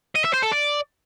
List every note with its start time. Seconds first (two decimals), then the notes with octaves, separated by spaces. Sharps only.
0.16 D#5
0.25 E5
0.34 C5
0.43 A4
0.52 D5